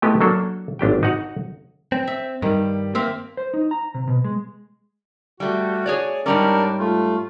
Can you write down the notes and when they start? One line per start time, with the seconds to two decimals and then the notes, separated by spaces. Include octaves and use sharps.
0.02 G#3 A3 B3 E4 G4 D#5
0.21 F#3 A#3 D4 A4
0.79 G#1 D4 G4 G5
1.03 D#4 F#4 F#5 A#5
1.92 C4
2.07 E5
2.42 G2 D#3 G3
2.95 A#3 C4 E5 F5
3.37 C5
3.54 D#4
3.71 A#5
3.94 C3
4.08 B2
4.24 G#3
5.40 G3 A3 F#4
5.86 G#4 C#5 D5
6.26 G#2 G3 C#4 D4 A#4 D5
6.79 A3 F4